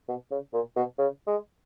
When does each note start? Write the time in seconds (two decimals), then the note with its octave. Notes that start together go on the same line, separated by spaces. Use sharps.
0.08 B2
0.31 C#3
0.53 A#2
0.76 B2
0.98 C#3
1.27 G#3